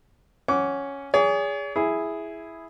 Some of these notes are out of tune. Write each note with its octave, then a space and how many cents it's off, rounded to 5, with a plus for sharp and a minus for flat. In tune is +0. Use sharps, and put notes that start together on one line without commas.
C#4 +0 F#5 +5 D6 -25
G#4 -15 C#5 +45
E4 +0 G#4 +0